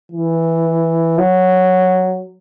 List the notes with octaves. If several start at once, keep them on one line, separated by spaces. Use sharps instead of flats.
E3
F#3